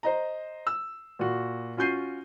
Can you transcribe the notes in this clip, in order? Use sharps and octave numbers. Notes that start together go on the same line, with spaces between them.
C5 D#5 A#5
E6
A#2 F#4
C#4 F4 F#4 G6 C7 D#7